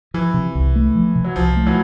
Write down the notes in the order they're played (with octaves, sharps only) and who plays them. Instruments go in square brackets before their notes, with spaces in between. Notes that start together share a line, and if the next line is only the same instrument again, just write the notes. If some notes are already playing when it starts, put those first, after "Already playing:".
[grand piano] E3 [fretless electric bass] F3
[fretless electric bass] C3
C2
A3
F3
C3
[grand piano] F#3
[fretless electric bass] C2 [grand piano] F3
[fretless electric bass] A3
[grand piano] E3 F#3